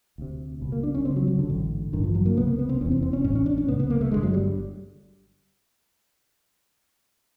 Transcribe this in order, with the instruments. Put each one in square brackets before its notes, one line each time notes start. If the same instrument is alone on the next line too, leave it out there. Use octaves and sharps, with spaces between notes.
[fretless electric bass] D2 C3
C#2 B2
A#3
D4
C#4
D2 C#3 C4
F#3
F#3
D3
A1 G#2
A1 G2 D3 D#3
F3
F#3
A#3
C#2 C3 B3
A#3
B3
C4
F1 E2 C3 C#4
C4
C4
C#4
A1 A2 C#4
C#4
D4
C#4
C#2 C3 B3
B3
A#3
A3
G1 F#2 D3 G#3
F#3
G3